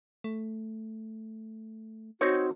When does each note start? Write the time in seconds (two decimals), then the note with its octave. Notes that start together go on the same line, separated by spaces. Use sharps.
0.24 A3
2.21 C4 D#4 F#4 C#5